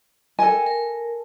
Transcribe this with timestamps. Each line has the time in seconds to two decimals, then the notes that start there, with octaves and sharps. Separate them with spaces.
0.39 A4 A#4 D#5 G5 G#5
0.66 A#4